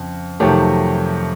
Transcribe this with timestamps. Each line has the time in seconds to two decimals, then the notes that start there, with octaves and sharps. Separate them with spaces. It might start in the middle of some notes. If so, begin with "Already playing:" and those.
Already playing: F2 C#3
0.40 F2 C3 D#3 F#3 A3 G4